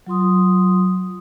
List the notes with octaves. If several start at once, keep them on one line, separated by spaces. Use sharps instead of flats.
F#3 F4 C6 D#6